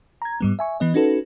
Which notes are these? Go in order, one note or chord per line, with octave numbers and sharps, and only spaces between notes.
A#5 G#6
G#2 G3 B3
E5 G#5 C#6
E3 B3 D#5
C#4 D#4 F#4 A4 B4